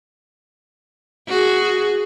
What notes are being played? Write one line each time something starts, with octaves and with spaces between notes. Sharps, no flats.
F#4 G#4